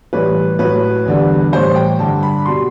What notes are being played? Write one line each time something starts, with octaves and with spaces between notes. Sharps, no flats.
A2 E3 G3 B4
A2 F#3 B4
E2 D3 G3
A2 E3 G3 C5
G5
G2 D3 G3 A5
B5
B2 G3 C6